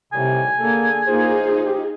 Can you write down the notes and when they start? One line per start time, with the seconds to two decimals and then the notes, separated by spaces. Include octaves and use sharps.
0.13 A2 C3 D#3 G3 G#5
0.60 D3 A#3 G#4 A4
1.07 A1 A#3 D#4 F4 G#4 C5
1.63 G4